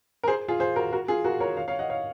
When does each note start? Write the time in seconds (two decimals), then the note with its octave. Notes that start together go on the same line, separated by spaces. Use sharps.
0.23 A#4
0.27 G#4 C5
0.48 F4 G#4
0.60 G#4 C5
0.76 F#4 A#4
0.93 F#4 A#4
1.08 F4 G#4
1.25 F#4 A#4
1.40 A#4 C#5
1.57 C#5 F5
1.68 C#5 F5
1.79 D#5 F#5
1.90 C#5 F5